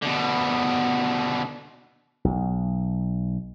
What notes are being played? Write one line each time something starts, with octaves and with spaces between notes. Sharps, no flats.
B2 D3
B1